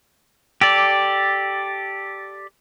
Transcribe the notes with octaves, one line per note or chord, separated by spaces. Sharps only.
G4 A4 D5